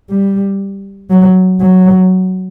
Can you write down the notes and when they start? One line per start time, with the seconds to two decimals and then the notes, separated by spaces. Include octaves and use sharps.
0.10 G3
1.11 F#3
1.61 F#3